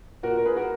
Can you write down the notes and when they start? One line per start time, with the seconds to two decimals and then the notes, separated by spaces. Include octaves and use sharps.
0.23 A#2 F#4 A#4
0.37 A#4
0.46 G#4 B4
0.57 F#4 A#4